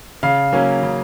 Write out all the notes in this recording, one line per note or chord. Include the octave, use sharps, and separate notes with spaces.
C#3 F5
F#3 A#3 C#4
C#3